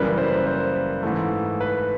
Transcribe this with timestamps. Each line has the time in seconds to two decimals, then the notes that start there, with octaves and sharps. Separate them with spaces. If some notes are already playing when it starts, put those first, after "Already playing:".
Already playing: F#2 C#3 E3 G3 A#3 B4
0.18 C5
0.47 C5
1.03 G#2 E3 A3
1.61 B4